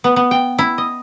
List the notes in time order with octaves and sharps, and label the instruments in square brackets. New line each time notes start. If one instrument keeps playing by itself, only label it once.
[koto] B3
B3
G5
E4
D#5